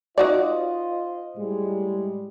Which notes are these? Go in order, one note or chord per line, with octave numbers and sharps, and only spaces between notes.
D#4 F4 F#4 C5 D5 D#5
A2 G3 G#3